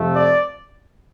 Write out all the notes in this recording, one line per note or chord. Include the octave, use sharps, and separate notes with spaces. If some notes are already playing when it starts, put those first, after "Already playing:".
Already playing: F2 C3 F3 A3
D5